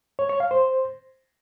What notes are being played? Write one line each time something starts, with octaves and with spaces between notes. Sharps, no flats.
C#5
C#5
F5
C5